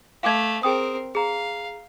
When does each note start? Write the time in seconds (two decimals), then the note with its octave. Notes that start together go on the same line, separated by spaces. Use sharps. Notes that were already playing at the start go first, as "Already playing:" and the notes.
0.23 A3 F5 D6 G#6
0.63 C4 G#4 A#4 G5 D#6
1.15 G#4 F5 A#5